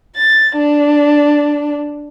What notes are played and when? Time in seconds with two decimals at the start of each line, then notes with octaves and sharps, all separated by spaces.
0.16 A6
0.57 D4